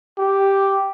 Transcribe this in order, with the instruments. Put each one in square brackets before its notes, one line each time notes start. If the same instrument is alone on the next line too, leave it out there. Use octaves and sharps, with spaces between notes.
[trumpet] G4